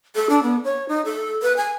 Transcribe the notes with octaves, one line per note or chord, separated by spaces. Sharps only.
A4
D4
B3
C#5
D#4
A4
B4
G#5